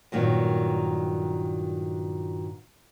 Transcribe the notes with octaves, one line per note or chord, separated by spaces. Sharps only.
G2 A#2 D#3 F#3